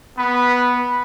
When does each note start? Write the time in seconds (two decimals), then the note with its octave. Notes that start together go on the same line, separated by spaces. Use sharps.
0.16 B3 B4